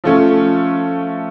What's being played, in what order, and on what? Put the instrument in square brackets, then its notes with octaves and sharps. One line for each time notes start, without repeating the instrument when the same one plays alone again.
[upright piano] F3 A3 C#4